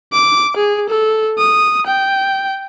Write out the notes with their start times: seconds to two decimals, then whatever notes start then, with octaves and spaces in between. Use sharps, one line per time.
0.12 D6
0.57 G#4
0.90 A4
1.38 D#6
1.87 G5